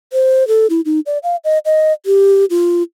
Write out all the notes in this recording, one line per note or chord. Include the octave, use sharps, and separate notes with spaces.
C5
A4
E4
D#4
D5
F5
D#5
D#5
G4
F4